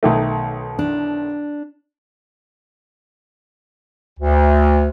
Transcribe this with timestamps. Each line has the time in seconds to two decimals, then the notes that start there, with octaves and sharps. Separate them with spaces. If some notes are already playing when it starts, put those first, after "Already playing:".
0.03 B1 D#3 A3
0.79 D4
4.18 D2